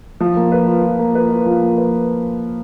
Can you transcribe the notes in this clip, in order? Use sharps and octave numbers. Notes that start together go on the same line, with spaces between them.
F3
A#3
B4
F4
F3
A#3
B4
F4
F3
A#3
B4